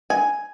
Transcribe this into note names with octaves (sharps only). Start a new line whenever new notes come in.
G#5